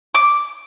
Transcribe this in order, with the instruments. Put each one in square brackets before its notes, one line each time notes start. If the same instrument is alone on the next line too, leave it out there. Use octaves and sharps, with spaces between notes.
[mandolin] D6